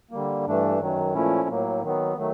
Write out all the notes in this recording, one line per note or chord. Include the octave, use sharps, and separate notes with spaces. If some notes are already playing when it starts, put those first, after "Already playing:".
D3 G3 A#3
G2 E3 A3 D4
F#2 D#3 F#3
A#2 F3 A3 C#4 E4
A2 F#3 A#3
D#3 F#3 B3
D#3 F#3 A3